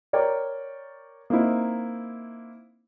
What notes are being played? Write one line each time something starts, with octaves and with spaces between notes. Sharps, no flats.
A#4 C#5 D5 G5
A#3 C4 D#4 E4